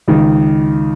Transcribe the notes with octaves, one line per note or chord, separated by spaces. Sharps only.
C#2 D#3